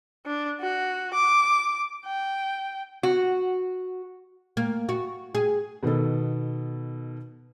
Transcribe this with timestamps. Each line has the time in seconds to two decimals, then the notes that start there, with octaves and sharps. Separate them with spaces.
0.26 D4
0.61 F#4
1.14 D6
2.06 G5
3.03 F#4
4.57 A#3
4.89 F#4
5.35 G#4
5.83 B2 D#3 B3 A4